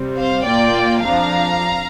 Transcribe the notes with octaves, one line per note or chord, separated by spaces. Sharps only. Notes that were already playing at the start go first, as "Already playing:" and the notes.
Already playing: C3 G3 C4
C5 F5
A#2 A#3 F4 D5 G5
F2 F3 D4 F5 A#5